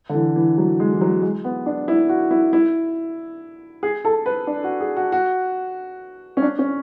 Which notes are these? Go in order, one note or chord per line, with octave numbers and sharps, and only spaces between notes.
D3
E3
E3
F#3
G#3
E3
F#3
G#3
B3
D4
E4
F#4
E4
E4
G#4
A4
B4
D4
F#4
G#4
F#4
F#4
C#4
D4
C#4